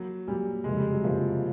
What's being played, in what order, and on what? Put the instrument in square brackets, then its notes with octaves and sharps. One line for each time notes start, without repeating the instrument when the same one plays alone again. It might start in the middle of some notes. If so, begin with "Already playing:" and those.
Already playing: [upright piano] F#3 [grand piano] A#3
[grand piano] A#2 F#3 A#3 [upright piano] G3
[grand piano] F#1 F2 C3 [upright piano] G#3
[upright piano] G3
F#3
[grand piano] F#1 F2 C3 [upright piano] F3